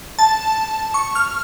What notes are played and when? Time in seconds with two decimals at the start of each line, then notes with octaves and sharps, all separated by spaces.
0.19 A5
0.94 C#6
1.15 F6